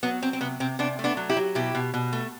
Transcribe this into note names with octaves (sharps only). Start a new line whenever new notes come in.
F#3 B3
F#3 C4
C4
C3 B3
C3 C4
C3 B3 D4
A3
B3 D4
F#3
E4 G4
F#3
B2 E4 G4
B2
B2
A3